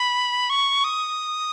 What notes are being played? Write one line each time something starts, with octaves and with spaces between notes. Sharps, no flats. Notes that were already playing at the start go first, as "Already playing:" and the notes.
Already playing: B5
C#6
D#6